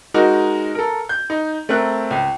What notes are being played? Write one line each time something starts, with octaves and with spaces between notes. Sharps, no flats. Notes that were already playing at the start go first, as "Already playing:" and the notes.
G#3 D#4 F#4 A#4
A4 A#4
G6
D#4
A3 C4 A#4 F#6
C#2